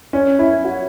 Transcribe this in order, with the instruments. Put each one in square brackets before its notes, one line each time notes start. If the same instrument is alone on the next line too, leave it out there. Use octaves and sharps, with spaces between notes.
[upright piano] C#4
E4
F#4